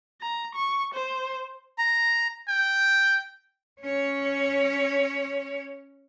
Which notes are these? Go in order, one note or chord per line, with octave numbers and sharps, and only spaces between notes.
A#5
C#6
C5
A#5
G5
C#4 C#5